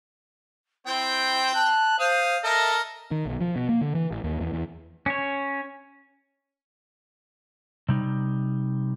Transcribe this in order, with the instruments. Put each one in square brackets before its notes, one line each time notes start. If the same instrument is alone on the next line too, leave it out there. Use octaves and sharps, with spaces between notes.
[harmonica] C4 G5 [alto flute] E4 [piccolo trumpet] C5
[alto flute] A5 [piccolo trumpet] F#6
[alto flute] C5 [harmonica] F5 [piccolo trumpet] D#6
[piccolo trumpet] A4 [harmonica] A#4 D#5 [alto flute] E5
[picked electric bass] D#3
B1
F3
B2
A#3
D3
E3
A1
D#2
E2
E2
[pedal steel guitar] C#4 C#5
[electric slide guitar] C3 G3 D#4